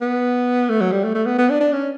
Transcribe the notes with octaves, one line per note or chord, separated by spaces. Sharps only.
B3
A3
F#3
G3
A3
A3
B3
B3
D4
D4
C#4